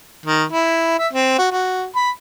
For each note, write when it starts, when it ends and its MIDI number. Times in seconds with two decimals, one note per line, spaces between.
0.26 0.44 51
0.52 0.98 64
0.99 1.08 76
1.13 1.35 60
1.39 1.49 66
1.52 1.86 66
1.96 2.10 83